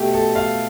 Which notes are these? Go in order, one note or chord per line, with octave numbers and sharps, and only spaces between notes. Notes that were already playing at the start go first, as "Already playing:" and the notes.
Already playing: B2 A3 G4
A4
F5